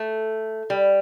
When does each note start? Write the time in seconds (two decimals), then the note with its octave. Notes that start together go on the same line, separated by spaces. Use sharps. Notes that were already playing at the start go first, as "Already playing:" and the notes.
Already playing: A3
0.70 G3